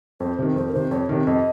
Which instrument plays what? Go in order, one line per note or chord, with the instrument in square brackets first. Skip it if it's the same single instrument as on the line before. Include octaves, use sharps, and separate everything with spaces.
[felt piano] F2 [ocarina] C5
[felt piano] C3 D#3
[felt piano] F2 [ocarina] C5
[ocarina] A#4
[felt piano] C3 D#3 [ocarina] C5
[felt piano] F2 [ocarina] C#5
[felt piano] C3 D#3
[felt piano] F2 [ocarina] D#5